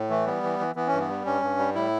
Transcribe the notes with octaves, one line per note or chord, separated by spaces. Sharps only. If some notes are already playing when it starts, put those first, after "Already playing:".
Already playing: A2
E3 A3
G3 B3
E3
E3
E3 B3
C#4
G2
B3
G3
G2 C#4
G2
G3
A2 E4